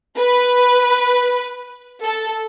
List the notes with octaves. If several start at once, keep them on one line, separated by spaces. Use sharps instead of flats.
B4
A4